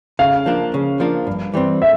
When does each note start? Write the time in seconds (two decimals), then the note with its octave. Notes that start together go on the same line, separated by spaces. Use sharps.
0.19 C#3 F5
0.46 F3 A#3 D4
0.74 C#3
1.00 F3 A#3 D4
1.27 G2
1.54 E3 G3 C4
1.82 E5